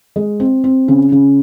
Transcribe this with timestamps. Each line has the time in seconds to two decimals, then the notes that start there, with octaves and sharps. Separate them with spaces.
0.16 G#3
0.40 C4
0.64 C4
0.88 C#3
1.12 C#3